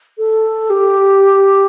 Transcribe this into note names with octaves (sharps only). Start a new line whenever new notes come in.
A4
G4